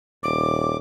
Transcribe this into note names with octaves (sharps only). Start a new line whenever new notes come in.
D#1 D6